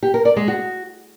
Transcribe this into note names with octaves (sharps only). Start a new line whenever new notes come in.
G4
A#4
D5
G#3
F#4